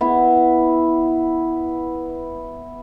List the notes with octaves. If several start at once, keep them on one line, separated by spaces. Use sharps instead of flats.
B3 E4